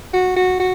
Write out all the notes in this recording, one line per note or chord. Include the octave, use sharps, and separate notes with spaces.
F#4
F#4
F#4